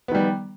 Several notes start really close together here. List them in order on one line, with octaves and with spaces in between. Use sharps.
B3 D#3 G3